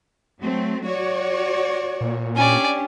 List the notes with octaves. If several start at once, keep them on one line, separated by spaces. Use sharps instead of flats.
F#3 A3 C4
F#4 C#5 D5
A#2
C#4 D4 G4 D5 G#5